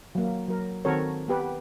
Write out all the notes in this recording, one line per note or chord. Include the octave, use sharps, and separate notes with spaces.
F#3 A#3
F#3 A#4
D#3 C4 F#4 A4 A#4 C#5
B3 G4 B4